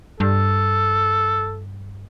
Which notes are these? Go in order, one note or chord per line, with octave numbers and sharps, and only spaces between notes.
G2 A4